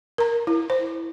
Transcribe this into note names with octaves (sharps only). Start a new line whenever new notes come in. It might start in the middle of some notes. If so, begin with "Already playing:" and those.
A#4 A#5
E4
C5